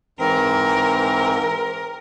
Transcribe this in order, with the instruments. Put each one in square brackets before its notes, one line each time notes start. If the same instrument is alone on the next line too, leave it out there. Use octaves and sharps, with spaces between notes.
[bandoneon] G#2 E3 C4 [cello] A#4